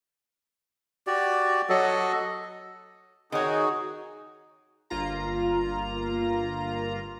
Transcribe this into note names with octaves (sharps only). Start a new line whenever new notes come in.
F#4 G4 D5
F#3 F#4 A4 D#5
D#3 D#4 F#4 G#4 C#5
G1 A#3 F4 A#5